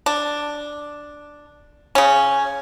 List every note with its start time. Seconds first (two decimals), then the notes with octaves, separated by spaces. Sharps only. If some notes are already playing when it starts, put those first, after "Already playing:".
0.06 D4
1.95 C#3 C#4